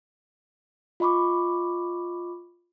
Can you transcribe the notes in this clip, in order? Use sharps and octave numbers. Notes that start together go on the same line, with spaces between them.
F4 D#5 B5 C#6 D6